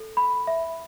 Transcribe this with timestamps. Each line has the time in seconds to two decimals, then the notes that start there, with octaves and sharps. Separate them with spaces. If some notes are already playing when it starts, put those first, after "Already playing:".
Already playing: A4
0.17 B5
0.47 E5